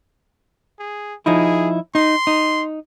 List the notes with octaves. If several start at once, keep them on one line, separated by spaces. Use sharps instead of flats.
G#4
F3 D#4 E4 G#4
D#4 C6
D#4